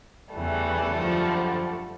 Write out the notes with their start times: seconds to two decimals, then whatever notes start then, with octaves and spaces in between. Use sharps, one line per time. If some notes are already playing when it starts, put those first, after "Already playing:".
0.34 E2 C#3 E3 G3 A3
0.97 F#2 D3 F3